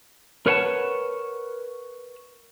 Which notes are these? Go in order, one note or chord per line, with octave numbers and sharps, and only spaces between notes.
A#4 B4 C#5 F#5 G#5 A5